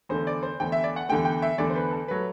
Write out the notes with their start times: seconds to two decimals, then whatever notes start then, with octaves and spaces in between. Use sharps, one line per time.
0.09 E2 D3 A3 C5
0.27 D5
0.43 C5
0.60 E2 D3 A3 G5
0.72 E5
0.84 D5
0.96 F#5
1.09 E2 D3 A3 G5
1.25 G5
1.42 E5
1.58 E2 D3 A3 D5
1.70 C5
1.75 B4
1.91 A4
2.08 F#3 A3 B4